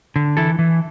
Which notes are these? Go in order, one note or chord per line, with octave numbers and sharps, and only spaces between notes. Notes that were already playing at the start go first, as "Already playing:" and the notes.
D3
E3 E4 A4
E3